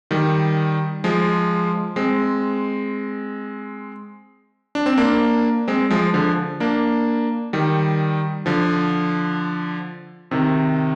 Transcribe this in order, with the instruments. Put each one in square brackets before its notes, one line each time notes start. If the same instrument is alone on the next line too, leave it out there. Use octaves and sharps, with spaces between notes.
[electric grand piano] D#3 G3
F3 G#3
G#3 C4
D4
C4
A#3 D4
G#3 C4
F3 G#3
D3 F3
A#3 D4
D#3 G3
D3 F3
C3 D#3